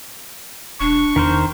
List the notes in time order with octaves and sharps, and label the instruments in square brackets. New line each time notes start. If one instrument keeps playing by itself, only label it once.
[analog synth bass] E1 [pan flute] D4 [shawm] C#6
[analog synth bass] E2 [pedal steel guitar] D#3 A#4 C5